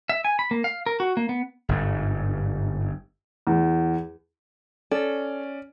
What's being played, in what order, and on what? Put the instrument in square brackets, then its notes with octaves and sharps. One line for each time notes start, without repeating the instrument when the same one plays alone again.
[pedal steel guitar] E5
G#5
B5
A#3
F5
A#4
F#4
A#3
B3
[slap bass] G1 G#2
[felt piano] E2
[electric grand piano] C#4 D5 [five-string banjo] A4